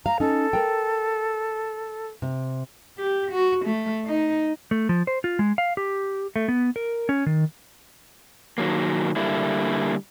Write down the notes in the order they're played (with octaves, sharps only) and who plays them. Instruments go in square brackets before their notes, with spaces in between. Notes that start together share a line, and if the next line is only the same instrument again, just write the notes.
[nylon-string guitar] F5 [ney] A#5
[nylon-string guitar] C#4 D#4 [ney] A4
[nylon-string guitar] A#4 G5
C3
[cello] G4
F#4
A3
D#4
[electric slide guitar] A3
F3
C5
F4
G#3
F5
G4
A3
B3
A#4
C#4
D#3
D#3 F#3 A#3
D3 G3 A#3 E4